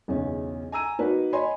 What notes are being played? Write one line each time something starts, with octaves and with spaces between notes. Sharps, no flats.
B1 E2 C#3 C#4
G#5 A#5 E6 D#7
A#3 D#4 F#4 A#4 B4
C#5 D#5 G#5 B5 C6